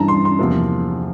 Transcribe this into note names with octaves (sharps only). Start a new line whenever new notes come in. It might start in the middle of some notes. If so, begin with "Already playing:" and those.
Already playing: G2 E3 G3 D4 A5 A#5
C6
C6
E2 C3 F3 A#3